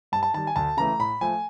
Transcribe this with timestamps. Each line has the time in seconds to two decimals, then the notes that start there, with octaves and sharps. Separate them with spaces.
0.12 G2 A5
0.23 A5
0.34 D#3 G3 A5
0.47 G#5
0.56 D2 A5
0.77 C#3 E3 A3 A#5
0.99 A2 B5
1.21 F3 A3 G#5